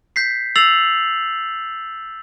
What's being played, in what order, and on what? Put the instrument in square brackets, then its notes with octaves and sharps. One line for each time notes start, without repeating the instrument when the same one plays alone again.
[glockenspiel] G6 B6 C7
E6 A6 C7 F7 F#7